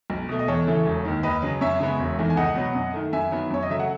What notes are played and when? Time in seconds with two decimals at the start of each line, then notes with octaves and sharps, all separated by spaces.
0.10 B1
0.29 B2 A3
0.39 D#5
0.48 E2 A4 C#5
0.67 C#3 E3 A3
0.85 E1
1.05 D#2 D#3
1.23 D#2 B4 D#5
1.42 C#3 F#3
1.61 F#2 C#5 E5
1.80 C#3 G#3 B3
1.99 E1
2.19 E2 D#3 A3
2.30 G#5
2.37 C#2 D#5 F#5
2.55 B2 F#3 B3
2.75 F#2
2.94 D#3 A3
3.13 F#2 E5 G#5
3.32 D#3 F#3 B3
3.50 F#2 C#5
3.62 D#5
3.70 C#3 F#3 A3 E5
3.80 F#5